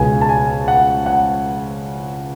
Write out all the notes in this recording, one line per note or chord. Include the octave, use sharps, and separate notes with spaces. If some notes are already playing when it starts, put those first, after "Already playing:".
Already playing: C#2 B2 G#3 G#5
A5
G#5
F#5
F#5